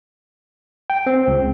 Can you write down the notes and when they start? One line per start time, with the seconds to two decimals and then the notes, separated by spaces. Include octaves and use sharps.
0.90 G5
1.06 C4
1.28 C#2